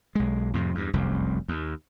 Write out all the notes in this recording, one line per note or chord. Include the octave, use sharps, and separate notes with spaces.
B1 G#3
F2 A2 C3
E2 G2
F1 C2 F#2
D#2